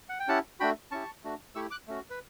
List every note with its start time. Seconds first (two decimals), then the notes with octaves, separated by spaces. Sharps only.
0.09 F#5
0.20 G5
0.28 C#4 E4 G4 F#5 A5
0.60 A3 D4 F#4 G5 B5
0.91 C#4 E4 G4 A5 C#6
1.24 A3 D4 F#4
1.55 A3 E4 G4 C#6 E6
1.71 D6 F#6
1.88 A3 C#4 F#4
2.10 B4